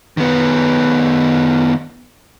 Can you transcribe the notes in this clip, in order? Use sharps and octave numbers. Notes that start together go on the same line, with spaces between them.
D#3 B3